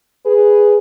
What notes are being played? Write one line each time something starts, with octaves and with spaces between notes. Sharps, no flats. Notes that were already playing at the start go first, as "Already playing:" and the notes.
G#4 B4